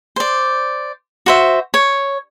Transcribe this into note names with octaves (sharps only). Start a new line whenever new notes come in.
C5 D5
F#4 C5 E5
C#5